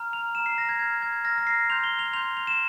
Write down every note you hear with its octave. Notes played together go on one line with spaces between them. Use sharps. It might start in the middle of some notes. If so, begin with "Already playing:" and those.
Already playing: A#5 F6
F7
A#5 F6 E7
C7
A#6
G#6
A#5 F6 G#6
G#6
A#5 F6 A#6
A#6
C7
C6 G6 F7
G7
F7
C6 G6 F7
F7
E7